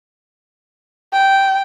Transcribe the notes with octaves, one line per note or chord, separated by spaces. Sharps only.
G5